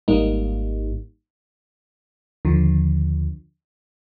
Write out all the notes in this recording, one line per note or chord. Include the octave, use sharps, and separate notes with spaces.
G#1 G#2 G3 A#3 D#4
D#2 D3 F3